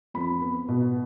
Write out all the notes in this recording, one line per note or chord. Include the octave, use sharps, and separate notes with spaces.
F2 B5
B3
B2